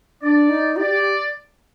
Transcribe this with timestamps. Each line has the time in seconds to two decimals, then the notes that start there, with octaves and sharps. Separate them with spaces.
0.22 D4 D5
0.49 D#4
0.76 G4 D5
0.90 G4